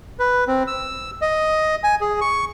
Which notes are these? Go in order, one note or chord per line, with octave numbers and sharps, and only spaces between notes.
B4
C4
E6
D#5
G#5
G#4
C#6